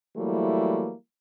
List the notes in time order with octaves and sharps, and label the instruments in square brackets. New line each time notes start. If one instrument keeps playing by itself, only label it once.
[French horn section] E3 F#3 G3 A3 A#3 E4